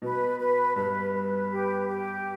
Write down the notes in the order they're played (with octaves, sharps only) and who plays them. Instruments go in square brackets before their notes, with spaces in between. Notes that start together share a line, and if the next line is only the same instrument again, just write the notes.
[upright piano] B2 [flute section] B4
[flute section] B4
[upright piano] G2 [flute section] B4
[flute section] B4
G4
G4